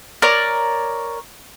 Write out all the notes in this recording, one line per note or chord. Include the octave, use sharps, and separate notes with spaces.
A#4 C#5 D5